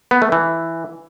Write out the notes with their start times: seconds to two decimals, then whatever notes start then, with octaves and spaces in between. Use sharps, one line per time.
0.11 B3
0.22 A3
0.32 E3